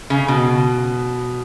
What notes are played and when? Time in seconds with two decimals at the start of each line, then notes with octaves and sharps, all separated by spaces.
0.10 C#3
0.28 B2